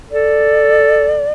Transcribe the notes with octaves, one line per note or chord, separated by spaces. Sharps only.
A4 D5